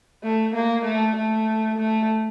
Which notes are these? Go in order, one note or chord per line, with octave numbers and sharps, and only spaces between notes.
A3
A#3
A3
A3
A3